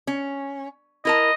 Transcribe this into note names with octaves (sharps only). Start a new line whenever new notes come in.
C#4
E4 A#4 D#5 A5